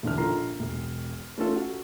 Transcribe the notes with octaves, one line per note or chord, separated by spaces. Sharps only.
E1 D3 E3 F6
A#1 F4 A4 A#4 A#5 C7
E1
A3 C#4 F4 A4
F#4